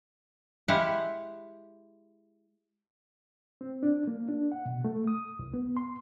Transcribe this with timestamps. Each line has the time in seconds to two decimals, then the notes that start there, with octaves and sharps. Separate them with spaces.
0.68 G#3 E4 G4 F5 F#5
3.61 C4
3.83 D4
4.07 A#3
4.29 D4
4.52 F#5
4.66 B2
4.85 A3
5.07 D#6
5.39 C2
5.54 B3
5.77 C6